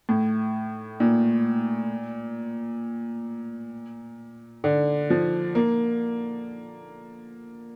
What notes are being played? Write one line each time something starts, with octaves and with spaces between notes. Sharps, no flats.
A2
A#2
D3
F3
A#3